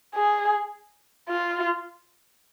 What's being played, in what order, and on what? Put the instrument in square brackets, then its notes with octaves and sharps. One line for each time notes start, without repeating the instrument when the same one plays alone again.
[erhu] G#4
F4